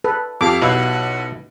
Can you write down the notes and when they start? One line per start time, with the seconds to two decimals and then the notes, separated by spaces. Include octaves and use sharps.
0.04 A4 B4
0.41 F2 G4 A4 F5 D6
0.62 B1 B2 E4 F5 F#5 E6